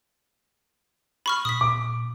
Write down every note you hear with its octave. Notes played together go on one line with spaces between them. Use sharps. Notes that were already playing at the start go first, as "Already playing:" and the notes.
B5 C#6 F6
A#2 D#6 B6
A#2 D6